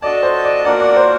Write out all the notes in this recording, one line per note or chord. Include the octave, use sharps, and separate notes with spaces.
D4 F#4 A4 D5 D#5 A5
C5
D5
A#3 D4 F#4 A#4 D5 F#5
D5
C5